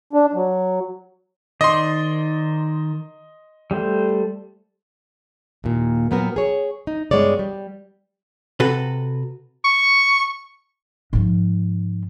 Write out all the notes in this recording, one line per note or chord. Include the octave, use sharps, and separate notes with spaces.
D4
F#3
D#3 C5 D5 D#5 C6
G3 A3 C5
D#2 A#2
A#2 F#3 B3 C4 A#4
G#4 C#5
D#4
G2 B2 G#3 B3 C#5 D5
G3
C3 F#4 A4 B4
C#6
G#2 F3